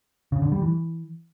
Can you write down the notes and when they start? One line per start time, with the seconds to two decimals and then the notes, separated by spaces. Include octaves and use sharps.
0.32 C#3
0.42 D3
0.52 G3
0.62 E3